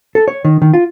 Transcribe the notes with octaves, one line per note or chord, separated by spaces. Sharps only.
A4
C#5
D#3
D#3
F4